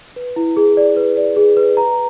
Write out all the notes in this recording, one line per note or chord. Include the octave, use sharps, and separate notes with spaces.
B4
E4
G#4
D5
B4
D5
G#4
B4
A#5